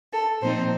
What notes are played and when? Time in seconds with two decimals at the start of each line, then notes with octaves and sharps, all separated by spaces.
0.13 A4
0.41 A#2 F3 C4 D#4 C5